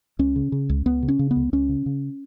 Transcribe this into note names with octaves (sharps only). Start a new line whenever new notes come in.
C#2 C#4
C#3
C#3
C#2
C#2 B3
C#3
C#4
C#3
B3
C#2
C#2 C#4
C#3
C#3